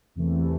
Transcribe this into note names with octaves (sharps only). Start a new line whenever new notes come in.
E2 C3 E3 A3